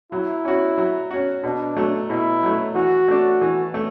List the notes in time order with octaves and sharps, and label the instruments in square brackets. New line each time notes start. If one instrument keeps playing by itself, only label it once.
[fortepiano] F#3 [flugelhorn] E4
[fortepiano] C#4 F#4
F#3
C#4 F#4
[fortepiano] B2 [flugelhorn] D4
[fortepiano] F#3 A3
[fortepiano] B2 [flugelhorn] E4
[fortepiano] F#3 A3
[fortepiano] E3 [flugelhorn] F#4
[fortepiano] A3 D4
E3
A3